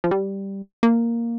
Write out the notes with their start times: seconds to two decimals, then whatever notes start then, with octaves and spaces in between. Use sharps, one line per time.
0.04 F3
0.11 G3
0.83 A#3